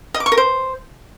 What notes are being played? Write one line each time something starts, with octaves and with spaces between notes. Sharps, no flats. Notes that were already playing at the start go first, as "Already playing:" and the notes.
D#5
D6
C#6
A#4
C5